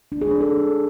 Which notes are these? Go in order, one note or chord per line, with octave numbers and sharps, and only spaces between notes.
D4
G#4
D4
A4